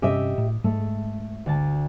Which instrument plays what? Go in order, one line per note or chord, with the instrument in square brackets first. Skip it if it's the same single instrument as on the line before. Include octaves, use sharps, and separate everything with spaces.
[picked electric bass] G2 C3 C#4 [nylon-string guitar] G4 D#5 E5 [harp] D6 D#6
[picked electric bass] A2
[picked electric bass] G#2 G#3 [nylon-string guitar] A3
[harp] D2 A5